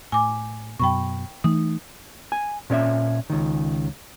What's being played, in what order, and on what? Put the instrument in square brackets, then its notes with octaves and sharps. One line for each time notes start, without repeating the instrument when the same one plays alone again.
[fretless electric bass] A2 [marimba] G#5 D6
[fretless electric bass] F#2 B2 [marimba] G5 B5 C#6
[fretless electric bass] E3 A3 [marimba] D#4
[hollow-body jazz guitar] G#5
A#2 C#4 D5 E5
C#2 D#3